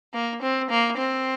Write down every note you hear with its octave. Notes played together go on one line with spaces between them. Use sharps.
A#3
C4
A#3
C4